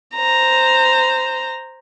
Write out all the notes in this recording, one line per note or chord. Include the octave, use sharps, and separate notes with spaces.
C5 A#5